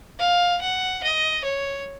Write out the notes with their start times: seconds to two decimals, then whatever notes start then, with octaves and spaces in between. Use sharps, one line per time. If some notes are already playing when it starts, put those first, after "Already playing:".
0.19 F5
0.61 F#5
1.03 D#5
1.44 C#5